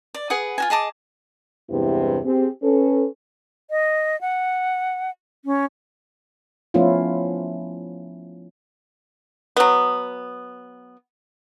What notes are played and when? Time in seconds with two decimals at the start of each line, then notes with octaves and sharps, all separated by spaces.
0.14 D5
0.30 G#4 B4 F#5 D#6
0.58 F4 F#4 G#5
0.70 G#4 D#5 A5 D6
1.70 E2 G2 C3 G#3 B3 E4
2.25 C4 G4 G#4
2.62 C#4 A4 B4
3.71 D#5
4.21 F#5
5.45 C#4
6.74 F3 A3 B3 C#4 E4 F4
9.56 F#3 B3